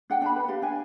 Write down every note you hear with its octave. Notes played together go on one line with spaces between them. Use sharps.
D4 F#5 G5
D4 A5 B5
B4 A5
G4 D5 F5
D4 G5 G#5